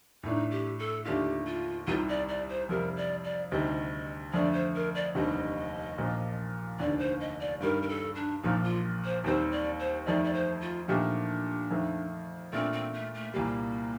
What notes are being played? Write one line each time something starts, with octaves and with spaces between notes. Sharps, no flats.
A2 A3 D4 D#4
G4
A4
D#2 D3 A3 D4 F4 G4
F4
C2 C3 D#3 G3 F4
D5
D5
C5
F2 C3 G3 A#4
D5
D5
D2 C3 D#3 G3 D#5
F2 D3 A3 D5
C5
A#4
D5
F1 D#2 D3 G3 C4 D#5
A#1 A#2 F3
F1 D#2 D3 D5
C5
D#5
D5
G2 D#3 G3 A#4
A#4
A4
D4
A#1 A#2 F3 D#4
F4
C5
D#2 D#3 G3 C4 C5
D5
C5
F2 D#3 A3 D#4 D5
D5
C5
F4
A#2 F3 A3 D4 D#4 G4
F2 D#3 A3
A#2 A3 C4 D4 F4
C4
A3
A3
C2 A#2 G3 A#3